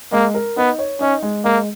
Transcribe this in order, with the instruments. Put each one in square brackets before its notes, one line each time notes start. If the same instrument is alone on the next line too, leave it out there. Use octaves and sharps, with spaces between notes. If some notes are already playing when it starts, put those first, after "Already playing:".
[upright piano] G#3 [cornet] A#3
[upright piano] A#4
[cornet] B3 [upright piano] D#4
[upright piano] C#5
[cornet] C#4 [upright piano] D#4
[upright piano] G#3
[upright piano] G#3 [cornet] A#3